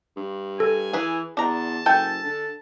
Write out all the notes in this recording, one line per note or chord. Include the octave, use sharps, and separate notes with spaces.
G2
A4 G#5
E3 G#4 B4
E2 D4 A5 A#5
F#1 A4 G5 G#5 G6
D3